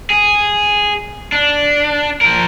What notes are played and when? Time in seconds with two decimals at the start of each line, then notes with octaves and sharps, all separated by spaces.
0.10 G#4
1.32 D4
2.21 F3 A#4